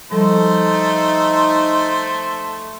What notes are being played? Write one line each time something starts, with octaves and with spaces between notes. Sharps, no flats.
F3 G3 A3 D#4 A4 C5